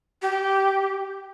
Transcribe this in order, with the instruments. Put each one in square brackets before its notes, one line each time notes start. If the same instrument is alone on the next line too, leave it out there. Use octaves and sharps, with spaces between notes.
[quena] G4